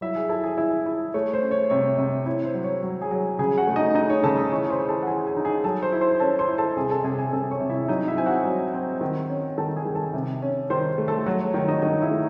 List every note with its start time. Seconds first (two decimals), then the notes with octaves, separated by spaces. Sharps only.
0.01 F#3 E4 E5
0.15 G#4 G#5
0.29 E4 A4 A5
0.44 G#4 G#5
0.57 E4 E5
0.86 E4
1.14 A3 C#5
1.33 C5
1.42 C#4
1.51 C#5
1.70 C3 C#5
1.98 C3
2.26 E4 C#5
2.46 C5
2.54 F#3
2.64 C#5
2.83 F#3 C#5
3.01 G#4 G#5
3.11 F#3
3.39 C#3 G#4 G#5
3.58 F#4 F#5
3.67 A3
3.76 D#4 D#5
3.95 D#4 D#5
4.10 C#5
4.24 C#3 A4 A5
4.37 D#5 D#6
4.52 E3 C#5 C#6
4.70 C5 C6
4.79 E3
4.88 A4 A5
5.03 F#5
5.07 E3 G#4 G#5
5.27 G#4 G#5
5.37 D#4
5.45 G#4 G#5
5.64 F#3 A4 A5
5.82 C5 C6
5.92 E4
6.01 C5 C6
6.20 C#4 A4 A5
6.39 C5 C6
6.48 E4
6.58 A4 A5
6.77 C3 G#4 G#5
6.90 A4 A5
7.04 C3 G#4 G#5
7.18 G#4 G#5
7.32 C3 A4 A5
7.51 C#5 C#6
7.60 C3
7.70 E4 E5
7.88 F#3 D#4 D#5
8.08 E4 E5
8.17 C4 G#5
8.26 F#4 F#5
8.45 F#3
8.74 C4
9.01 D#3
9.29 C#4
9.58 D#3 A4 A5
9.76 G#4 G#5
9.85 D#3
9.95 A4 A5
10.14 C3
10.42 C#4
10.70 D#3 C5 C6
10.98 A3
11.08 A4 A5
11.26 F#3 F#4 F#5
11.41 C#5
11.54 D#3 C#5
11.68 D#4 D#5
11.82 D#3 D#4 D#5
12.02 E4 E5
12.11 A3